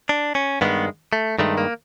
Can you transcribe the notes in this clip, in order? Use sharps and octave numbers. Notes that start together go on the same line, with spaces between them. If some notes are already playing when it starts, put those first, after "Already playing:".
D4
C#4
G2 D#3 G#3 B3
A3
G2 D#3 G#3 A3
A#3